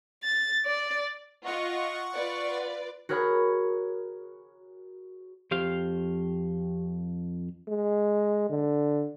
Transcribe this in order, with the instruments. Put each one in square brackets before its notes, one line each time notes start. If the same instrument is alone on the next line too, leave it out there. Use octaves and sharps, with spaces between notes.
[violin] A6
D5
[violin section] F4 D#5 [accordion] F#5 C#6
[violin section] F4 B4 D5
[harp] F#4 G#4 A#4 C#5 F#5 B5
[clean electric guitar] F2 C5 F5 [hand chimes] G4
[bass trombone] G#3
D3